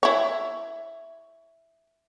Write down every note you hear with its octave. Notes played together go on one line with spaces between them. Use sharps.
E4 C#5